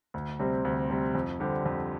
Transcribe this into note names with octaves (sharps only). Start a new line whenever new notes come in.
D2
C3 G3 C4
D2
C3 G3 C4
F2
D3 G3 C4 G4
F2